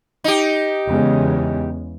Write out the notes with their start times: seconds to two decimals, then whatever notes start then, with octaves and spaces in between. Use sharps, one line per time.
0.24 D#4 G4
0.86 E2 C#3 G#3